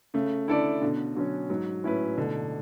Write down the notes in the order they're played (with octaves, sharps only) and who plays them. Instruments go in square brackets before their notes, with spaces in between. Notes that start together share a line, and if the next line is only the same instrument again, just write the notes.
[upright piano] C#3 [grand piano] A3
[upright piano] D3 [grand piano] E4 A4 D5
[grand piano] B2 [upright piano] D3
[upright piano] D3 [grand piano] F#3 C#4
[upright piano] G#2 [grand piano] F#3
[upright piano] A2 [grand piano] C#4 E4 B4
[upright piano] B2 [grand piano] D3